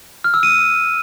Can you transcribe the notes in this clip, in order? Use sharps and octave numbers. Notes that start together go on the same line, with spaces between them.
F6
E6
D#7